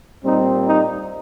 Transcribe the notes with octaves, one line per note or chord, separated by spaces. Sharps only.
A#2 G3 C4 D#4
D#4